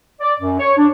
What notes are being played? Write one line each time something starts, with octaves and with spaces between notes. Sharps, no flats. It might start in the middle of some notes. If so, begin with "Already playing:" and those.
D5
F#2
C#5
D4